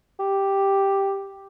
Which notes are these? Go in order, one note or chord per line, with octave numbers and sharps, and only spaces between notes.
G4